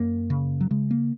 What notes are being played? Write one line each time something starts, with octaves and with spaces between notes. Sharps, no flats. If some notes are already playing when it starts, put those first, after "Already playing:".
Already playing: F#2 A#3
C#3
F#3
C#3 G#3
A#3